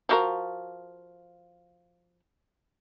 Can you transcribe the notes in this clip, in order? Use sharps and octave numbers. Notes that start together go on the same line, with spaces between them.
F3 F#4 A#4